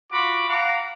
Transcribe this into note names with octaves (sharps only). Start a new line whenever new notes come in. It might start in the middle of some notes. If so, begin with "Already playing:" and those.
F4 F#4 B5 D6
F5 F#5 A#5 D6